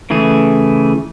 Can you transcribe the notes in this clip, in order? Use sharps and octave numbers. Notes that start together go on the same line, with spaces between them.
C#3 E3 A3 G#4